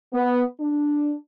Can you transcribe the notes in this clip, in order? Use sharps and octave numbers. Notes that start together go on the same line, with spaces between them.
B3
D4